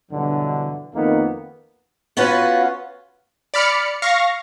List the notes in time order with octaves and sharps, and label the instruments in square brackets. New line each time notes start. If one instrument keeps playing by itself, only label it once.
[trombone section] G2 B2 D3 E3 F#3
F2 D#3 A#3 B3 D#4
[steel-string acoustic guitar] B3 C#4 F4 F#4 B4
[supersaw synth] D5 B5 F6 C#7
F5 C#6 A#6